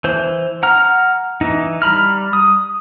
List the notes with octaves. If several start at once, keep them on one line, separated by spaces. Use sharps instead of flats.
E3 C5
F#5 A#5 F6
E3 D#4
G3 A#5 B5 F6
D#6